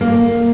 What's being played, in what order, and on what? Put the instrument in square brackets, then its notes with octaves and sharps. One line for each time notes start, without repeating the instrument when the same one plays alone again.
[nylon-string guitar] A#3